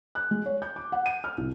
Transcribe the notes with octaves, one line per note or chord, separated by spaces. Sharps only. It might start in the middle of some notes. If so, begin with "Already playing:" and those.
F#6
G#3
C#5
G6
D6
F#5
D#7
F6
C2